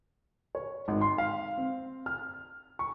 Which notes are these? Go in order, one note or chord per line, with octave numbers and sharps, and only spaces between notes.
C#5
G#1
C6
F5
C4
F6
C#6